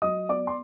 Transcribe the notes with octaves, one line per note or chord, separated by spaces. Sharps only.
F#3 D#5 D#6
B3 D5 D6
C6